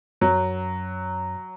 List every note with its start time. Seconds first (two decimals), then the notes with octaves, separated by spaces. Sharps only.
0.21 F#2 F#3